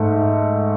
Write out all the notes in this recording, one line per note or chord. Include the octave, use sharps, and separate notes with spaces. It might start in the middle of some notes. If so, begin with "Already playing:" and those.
Already playing: G#2 A3